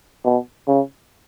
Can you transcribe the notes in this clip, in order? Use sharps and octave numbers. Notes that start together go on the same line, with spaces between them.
B2
C#3